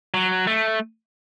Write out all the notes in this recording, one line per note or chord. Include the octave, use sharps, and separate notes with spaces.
F#3
A3